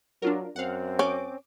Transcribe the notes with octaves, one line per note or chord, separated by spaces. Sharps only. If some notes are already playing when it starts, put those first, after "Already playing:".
F#3 D4 F4 A#4
F#2 C4 F5 F#5
C#4 D6